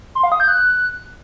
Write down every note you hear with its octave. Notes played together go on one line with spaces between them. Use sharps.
C6
F5
D#6
G6
F#6